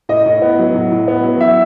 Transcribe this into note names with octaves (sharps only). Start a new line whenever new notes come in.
A2 D#5
A2
B3
F#3
A2
A2
B3
F#3
E3 E5